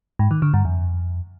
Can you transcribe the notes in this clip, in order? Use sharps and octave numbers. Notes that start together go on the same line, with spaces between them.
G#2
D#3
D3
G2
F2